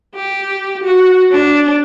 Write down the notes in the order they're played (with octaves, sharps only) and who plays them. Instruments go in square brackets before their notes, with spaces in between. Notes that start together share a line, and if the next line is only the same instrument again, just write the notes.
[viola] G4
F#4
D4